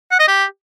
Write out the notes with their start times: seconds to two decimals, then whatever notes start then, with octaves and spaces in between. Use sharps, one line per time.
0.11 F#5
0.19 D#5
0.28 G4